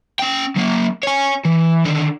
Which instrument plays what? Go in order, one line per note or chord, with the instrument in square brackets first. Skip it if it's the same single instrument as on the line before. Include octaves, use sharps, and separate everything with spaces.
[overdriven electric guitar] C#4 G5
F#3 A#3
C#5 G#5
E3
D3 D#3